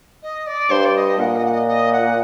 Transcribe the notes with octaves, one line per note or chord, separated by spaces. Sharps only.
D#5
D5
G2 C5
D5
D#5
A#2 F#5
D#5
F#5
D#5
D#5
F#5